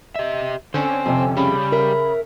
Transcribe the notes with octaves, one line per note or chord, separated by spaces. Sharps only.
G4 D#5 E5
D3 C4 C#4 C5 G#5
F2 C3
C#3 G3 B5
A#4 E5